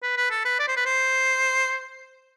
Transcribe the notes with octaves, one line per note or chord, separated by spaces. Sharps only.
B4
B4
A4
B4
D5
C5
B4
C5